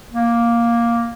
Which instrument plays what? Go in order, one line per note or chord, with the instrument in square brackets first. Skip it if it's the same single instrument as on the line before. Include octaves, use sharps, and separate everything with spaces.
[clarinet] A#3